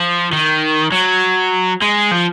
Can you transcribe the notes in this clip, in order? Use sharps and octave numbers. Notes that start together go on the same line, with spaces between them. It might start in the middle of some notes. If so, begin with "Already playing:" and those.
Already playing: F3
D#3
F#3
G#3
F3